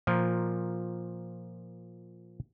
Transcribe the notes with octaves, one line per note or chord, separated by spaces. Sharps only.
A#2 F3 A#4